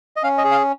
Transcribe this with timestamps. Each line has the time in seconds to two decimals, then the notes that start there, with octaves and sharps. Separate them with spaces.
0.16 D#5
0.23 C#4 F5
0.38 D#5
0.44 G#4
0.51 F5